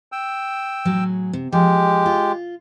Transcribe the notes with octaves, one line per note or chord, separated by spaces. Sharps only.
G5 E6
A2 F#3 G#4
C3
F3 G#3 G4
F4